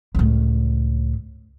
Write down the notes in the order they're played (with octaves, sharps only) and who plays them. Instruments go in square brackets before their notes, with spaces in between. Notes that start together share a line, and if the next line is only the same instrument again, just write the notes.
[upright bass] C#2 A2